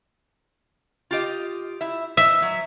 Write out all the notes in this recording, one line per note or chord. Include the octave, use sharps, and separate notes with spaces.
F4 G4 D#5
E4 E5
C5 D#5 E5
F#3